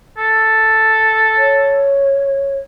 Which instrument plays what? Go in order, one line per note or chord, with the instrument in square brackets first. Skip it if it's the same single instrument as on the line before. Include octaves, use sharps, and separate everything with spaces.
[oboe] A4
[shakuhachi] C#5